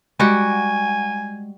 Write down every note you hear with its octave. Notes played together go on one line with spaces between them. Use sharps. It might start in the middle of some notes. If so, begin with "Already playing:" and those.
G3 G#3 F#4 G5 G#5